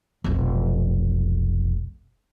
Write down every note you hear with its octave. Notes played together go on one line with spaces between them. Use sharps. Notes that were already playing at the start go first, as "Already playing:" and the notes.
F1 B1